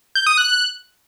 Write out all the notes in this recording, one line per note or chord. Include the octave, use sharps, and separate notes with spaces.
G6
D#6
F#6